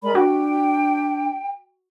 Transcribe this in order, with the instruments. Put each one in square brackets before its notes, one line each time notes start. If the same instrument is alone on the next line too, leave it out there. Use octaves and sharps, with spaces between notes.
[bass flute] G#3 [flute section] A#4 D5 B5
[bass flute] D4 [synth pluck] F#4 [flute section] G5